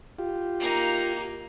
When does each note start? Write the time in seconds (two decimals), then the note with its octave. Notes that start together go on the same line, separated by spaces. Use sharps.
0.19 F4 G4
0.59 A#3 D#4